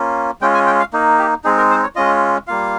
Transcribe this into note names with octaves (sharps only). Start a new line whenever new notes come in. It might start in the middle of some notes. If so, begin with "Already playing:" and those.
Already playing: A#3 C#4 F4
G#3 C#4 F4 G5
G#5
G5
F5
A#3 D#4
G4
G#3 C4 D#4 G#4
A#4
C5
C#5
G#3 C#4 F4 D#5
G3 A#3 F4 F5